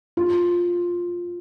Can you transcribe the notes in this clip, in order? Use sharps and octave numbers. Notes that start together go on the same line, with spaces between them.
F4